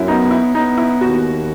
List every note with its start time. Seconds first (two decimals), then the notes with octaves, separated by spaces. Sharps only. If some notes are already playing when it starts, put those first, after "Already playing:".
Already playing: F#2 C#4 E4
0.08 B3 D#4
0.31 E4
0.54 B3 D#4
0.78 E4
1.01 D#2 F#4